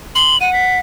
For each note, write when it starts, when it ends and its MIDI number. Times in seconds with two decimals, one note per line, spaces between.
0.15 0.37 84
0.15 0.38 102
0.41 0.80 78
0.41 0.53 99
0.53 0.78 95